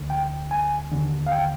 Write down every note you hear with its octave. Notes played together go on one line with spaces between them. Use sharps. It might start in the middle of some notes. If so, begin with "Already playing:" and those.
Already playing: D2 D3
G5
G#5
D#2 D3
F5
G5